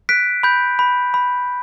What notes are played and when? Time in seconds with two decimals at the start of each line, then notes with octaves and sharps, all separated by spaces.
0.09 F#6 B6 D7
0.43 B5 G6
0.79 B5
1.14 B5